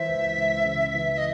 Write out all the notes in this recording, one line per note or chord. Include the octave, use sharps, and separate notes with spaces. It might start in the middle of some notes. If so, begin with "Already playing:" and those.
Already playing: E3 C5 E5
C#2
C#2
C#3
E3
D#5